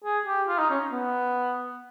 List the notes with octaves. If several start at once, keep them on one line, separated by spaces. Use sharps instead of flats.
G#4
G4
F4
D#4
C#4
B3